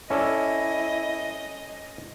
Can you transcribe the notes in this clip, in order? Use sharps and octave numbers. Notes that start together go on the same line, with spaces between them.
C#4 E4 A4 D5 D#5